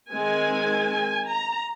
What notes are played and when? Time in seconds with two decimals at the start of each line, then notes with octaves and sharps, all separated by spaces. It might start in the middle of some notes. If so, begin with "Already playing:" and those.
0.11 D#3 G#3 C4 G#5
1.29 A#5